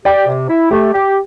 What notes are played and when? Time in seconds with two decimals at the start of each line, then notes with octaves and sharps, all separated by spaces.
0.05 G4 D5 G5
0.28 C3
0.49 E4
0.71 A3 G4
0.93 G4